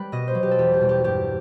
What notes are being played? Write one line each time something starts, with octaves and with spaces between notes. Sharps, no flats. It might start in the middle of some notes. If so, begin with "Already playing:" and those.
Already playing: G3 G4 B4
B2 D#5
C5
F#3
G4
A4
E2 G4
G4
B2 G3
G4
G2 G4